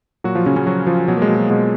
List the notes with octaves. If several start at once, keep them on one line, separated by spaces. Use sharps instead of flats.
A#2 F#3 F#4
F3 F4
C#3 F3 C#4
C#3 C#4
F3 F#3 F#4
F3 F4
B2 F#3
A#3
G#3
B2
F#3
B2 G#3